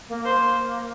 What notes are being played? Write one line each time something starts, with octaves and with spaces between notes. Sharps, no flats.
A#3
A#3 C5